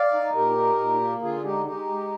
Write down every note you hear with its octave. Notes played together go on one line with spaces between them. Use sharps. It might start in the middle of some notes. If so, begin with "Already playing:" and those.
Already playing: D5 F5
D#4
A#2 G4 A#4
D#4
A#2
A#3
D3 F4 G#4
G#3 D#4 G4
G#3 D#4 G4
G#3